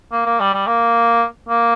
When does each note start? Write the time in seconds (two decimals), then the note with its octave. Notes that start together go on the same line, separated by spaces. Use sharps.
0.12 A#3
0.26 A#3
0.40 G3
0.54 G3
0.67 A#3
1.49 A#3